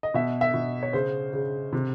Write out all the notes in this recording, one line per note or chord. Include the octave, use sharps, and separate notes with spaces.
D#5
B2 E5
E5
B2
C#5
C#3 C5
C#3
C3